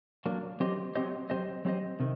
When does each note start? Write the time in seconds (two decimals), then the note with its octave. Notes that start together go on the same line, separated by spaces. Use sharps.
0.25 F#3 A#3 D4
0.60 F#3 C4 G4 C5 D#5
0.95 F#3 C4 G4 C5 D#5
1.30 F#3 C4 G4 C5 D#5
1.65 F#3 C4 G4 C5 D#5
2.00 C3 D#3